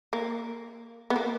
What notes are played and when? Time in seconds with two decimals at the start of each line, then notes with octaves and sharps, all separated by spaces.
0.13 A#3
1.10 B3
1.16 A#3